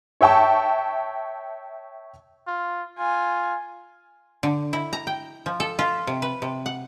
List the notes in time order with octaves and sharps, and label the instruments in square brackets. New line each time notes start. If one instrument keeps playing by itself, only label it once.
[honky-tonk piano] C#5 E5 G5 A5 C#6
[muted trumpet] F4
[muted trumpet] F4 [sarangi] G#5
[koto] D3
E4
A#5
G5
F3
A4
F4
C3
B4
C3
F#5